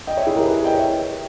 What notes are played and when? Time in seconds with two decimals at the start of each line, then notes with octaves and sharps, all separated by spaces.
0.07 D#5 G5
0.17 C#5 E5
0.27 E4 G#4
0.36 G4 A#4
0.46 G#4 B4
0.65 D#5 G5
0.74 C#5 E5